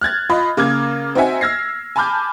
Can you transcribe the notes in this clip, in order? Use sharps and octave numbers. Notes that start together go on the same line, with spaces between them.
F6 F#6 G#6 A6
F4 D#5 B5
C#3 A#3 D6 F6 G#6
C4 D#4 F#4 E5 G#5
E6 F6 G#6 A#6 C7
G#5 A5 B5 D6 F6 G6